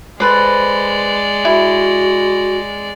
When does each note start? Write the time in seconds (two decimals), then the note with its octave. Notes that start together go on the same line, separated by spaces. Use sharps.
0.20 G#3 A4 B4 C5 D5
1.45 E4 F#4